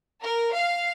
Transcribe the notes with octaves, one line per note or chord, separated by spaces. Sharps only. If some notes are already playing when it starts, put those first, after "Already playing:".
A#4
F5